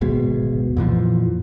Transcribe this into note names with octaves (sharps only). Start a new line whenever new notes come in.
D1 G#1 B2 G#3
F2 A#2 E3 F3